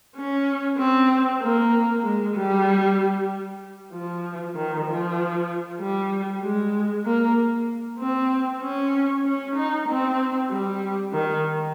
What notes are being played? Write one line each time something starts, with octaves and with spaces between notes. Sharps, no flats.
C#4
C4
A#3
G#3
G3
F3
D#3
F3
G3
G#3
A#3
C4
C#4
C#4
D#4
C4
G3
D#3